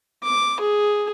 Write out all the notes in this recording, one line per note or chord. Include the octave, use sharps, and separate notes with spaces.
D6
G#4